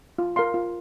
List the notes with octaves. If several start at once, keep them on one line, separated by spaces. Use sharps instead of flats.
F4
A#4 F5 C6
F4